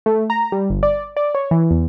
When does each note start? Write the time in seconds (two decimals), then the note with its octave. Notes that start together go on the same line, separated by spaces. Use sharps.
0.06 A3
0.30 A#5
0.52 G3
0.70 G1
0.83 D5
1.17 D5
1.35 C#5
1.51 E3
1.71 E2